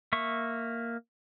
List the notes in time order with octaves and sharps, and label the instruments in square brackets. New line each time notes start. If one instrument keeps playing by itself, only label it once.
[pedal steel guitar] A#3 E5 C#6